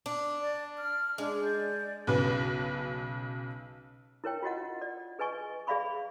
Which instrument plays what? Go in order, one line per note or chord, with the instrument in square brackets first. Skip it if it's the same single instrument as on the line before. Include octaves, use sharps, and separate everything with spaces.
[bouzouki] D4
[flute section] D5
F6
[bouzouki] G#3 [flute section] D4
[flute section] D5 G6
[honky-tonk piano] B1 C#3 B4
[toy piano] E4 A#4 C#5 G5
F4 F#4 D#5 F#5
D5
G#4 B4 D#5 G#5 C#6
G#4 D5 E5 F5 B5 C#6